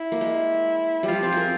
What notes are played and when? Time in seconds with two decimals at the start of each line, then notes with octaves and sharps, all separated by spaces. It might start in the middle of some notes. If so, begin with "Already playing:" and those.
Already playing: E4
0.12 A#3
0.21 G#3
1.03 G3
1.08 F3 F4
1.23 C4
1.32 G#4 A#4